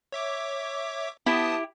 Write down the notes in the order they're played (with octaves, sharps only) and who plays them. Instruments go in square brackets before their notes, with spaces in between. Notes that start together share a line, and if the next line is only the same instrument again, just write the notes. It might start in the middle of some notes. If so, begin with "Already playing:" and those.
[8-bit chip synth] C#5 E5 D6
[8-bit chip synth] B3 A5 D#6 [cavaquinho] E4 G4